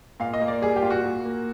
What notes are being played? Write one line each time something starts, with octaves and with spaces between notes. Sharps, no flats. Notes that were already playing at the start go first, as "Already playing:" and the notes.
A#2 F5
D#5
A#3
D5
G3 G#4
G4
A#2 F4
F#4
A#2
A#3